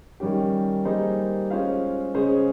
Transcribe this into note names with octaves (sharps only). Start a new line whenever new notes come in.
D#3 G3 C#4 G4
G3 A#3 D#4 G#4 C5
G#3 C#4 F4 C5 F5
C#3 G#3 C#4 G#4 C5